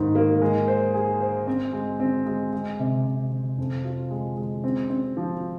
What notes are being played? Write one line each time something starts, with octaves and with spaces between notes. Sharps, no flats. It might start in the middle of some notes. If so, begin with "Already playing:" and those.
Already playing: G#2 D#3 A#3
A#3
G#3
C5
G#4
C5
C4
G#3
C4
G#3
G#3
C3
C3
C3
F2
F4
G#3
G#3
C4
C4
F3